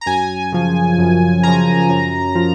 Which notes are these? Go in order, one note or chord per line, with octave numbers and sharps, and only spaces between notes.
A#5
F#2 G#5
C#3 F3
F#2
C#3 F3 A#5
F#2
F3